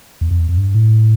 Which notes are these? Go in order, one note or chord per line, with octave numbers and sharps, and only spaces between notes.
E2
F2
E2
F2
G2
A2